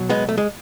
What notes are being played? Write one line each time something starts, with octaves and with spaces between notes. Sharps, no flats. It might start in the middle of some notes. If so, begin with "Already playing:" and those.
Already playing: B2 F#3
G#3 B3
A3
G#3